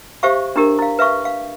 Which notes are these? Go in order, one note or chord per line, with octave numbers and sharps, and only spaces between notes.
G4 C5 E5 F5 C#6
D4 E4 G4 A#4
E4 F5
B4 E5 F5 C#6
F5